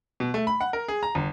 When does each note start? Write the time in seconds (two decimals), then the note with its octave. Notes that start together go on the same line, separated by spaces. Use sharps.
0.20 B2
0.34 A3
0.47 B5
0.61 F#5
0.73 A#4
0.88 G#4
1.03 A#5
1.15 G1